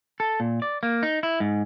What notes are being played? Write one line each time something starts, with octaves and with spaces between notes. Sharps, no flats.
A4
A#2
D5
A#3
D#4
E4
G#2